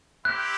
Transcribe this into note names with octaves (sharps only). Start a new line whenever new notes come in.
C4 E4 G4 F#6